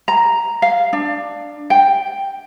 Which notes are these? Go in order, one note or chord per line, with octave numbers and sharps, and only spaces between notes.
A#5
F5
D4
G5